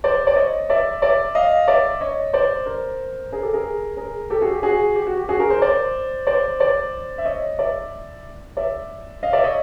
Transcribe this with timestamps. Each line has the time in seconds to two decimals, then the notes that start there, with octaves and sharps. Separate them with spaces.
0.04 C5 D5
0.27 D5
0.36 C#5 D#5
0.69 D5 E5
1.02 D5 E5
1.35 D#5 F5
1.68 D5 E5
2.01 C#5 D#5
2.33 C5 D5
2.66 A#4 C5
3.32 G#4 A#4
3.42 G4 A4
3.53 G#4 A#4
3.97 G#4 A#4
4.30 G4 A4
4.41 F#4 G#4
4.52 G4
4.63 F#4 G#4
4.96 G4
5.07 F#4
5.18 G4
5.29 F#4 G#4
5.40 G#4 A#4
5.50 A#4 C5
5.62 C5 D5
6.27 C5 D5
6.60 C5 D5
7.18 E5
7.25 C#5 D#5
7.58 D5 E5
8.57 D5 E5
9.23 D#5 F5
9.33 D5 E5
9.44 C#5 D#5